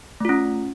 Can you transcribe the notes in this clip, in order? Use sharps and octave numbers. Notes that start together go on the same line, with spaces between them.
A3 C#4 F4